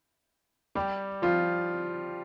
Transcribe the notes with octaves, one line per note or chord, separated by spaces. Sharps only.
G3 G4
F3 F4